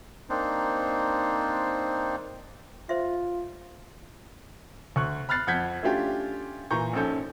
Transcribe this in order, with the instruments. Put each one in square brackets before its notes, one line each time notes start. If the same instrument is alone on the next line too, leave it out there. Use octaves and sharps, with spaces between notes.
[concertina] A#3 C4 D4 D#4 C5
[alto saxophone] F4 [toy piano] C5 E5
[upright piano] D2 C#6 F#6
B5 F6 F#6 A6 C7
F2 F#5 G6 G#6 B6
A3 C#4 D4 F4 G4
A#2 E3 A#5 C#6 G6
A#1 G#2 C#4 A4 G6